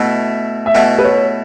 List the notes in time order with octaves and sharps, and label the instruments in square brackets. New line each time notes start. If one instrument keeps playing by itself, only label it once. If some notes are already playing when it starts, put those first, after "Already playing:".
Already playing: [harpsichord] B2 A3 E4
[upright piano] E5
[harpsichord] B2 A3 E4 [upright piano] F#5
[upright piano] B4
C#5